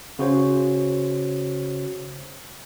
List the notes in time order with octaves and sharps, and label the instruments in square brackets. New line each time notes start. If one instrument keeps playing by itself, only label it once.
[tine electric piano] C#3 F#4 C5 C#5